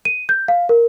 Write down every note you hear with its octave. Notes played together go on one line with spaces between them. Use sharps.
D#7
G6
F5
A#4